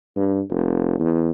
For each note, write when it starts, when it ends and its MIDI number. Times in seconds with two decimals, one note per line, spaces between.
0.16 0.41 43
0.50 0.95 29
1.00 1.31 40